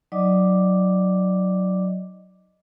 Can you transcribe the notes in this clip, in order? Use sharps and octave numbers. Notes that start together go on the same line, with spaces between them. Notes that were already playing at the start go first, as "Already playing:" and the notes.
F#3 D#4 D5 D#5 D6